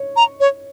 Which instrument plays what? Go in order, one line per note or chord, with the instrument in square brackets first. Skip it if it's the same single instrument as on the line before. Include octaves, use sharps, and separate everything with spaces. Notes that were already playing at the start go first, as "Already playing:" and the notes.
Already playing: [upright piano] C#5
[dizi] A#5
C#5